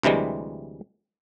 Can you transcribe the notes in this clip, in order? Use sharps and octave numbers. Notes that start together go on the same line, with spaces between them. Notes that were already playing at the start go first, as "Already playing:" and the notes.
D2 C3 E3 G3 G#3